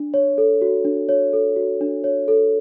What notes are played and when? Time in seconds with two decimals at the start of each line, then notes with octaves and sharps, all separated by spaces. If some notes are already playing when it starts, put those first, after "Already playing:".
Already playing: D4
0.14 C#5
0.38 A4
0.62 F#4
0.85 D4
1.09 C#5
1.33 A4
1.56 F#4
1.81 D4
2.04 C#5
2.28 A4